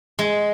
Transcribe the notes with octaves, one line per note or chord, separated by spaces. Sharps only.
G#3